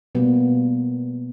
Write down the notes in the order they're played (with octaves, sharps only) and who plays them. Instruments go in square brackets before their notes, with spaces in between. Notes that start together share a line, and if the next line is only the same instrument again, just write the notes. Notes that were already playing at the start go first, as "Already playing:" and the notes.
[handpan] B2 G3 A#3 B3